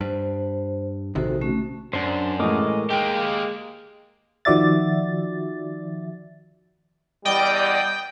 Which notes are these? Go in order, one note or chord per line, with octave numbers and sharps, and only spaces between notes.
G2 C5
A#1 C3 D#3 F#4 A4 C5
A3 C#4 F#4
F#2 D4 C5
A2 E3 G#3 A#4 D#5 D6
G#3 A#3 G4 G5
D#3 F3 F#4 D5 E5 A6
E2 G3 D5 D#5 G5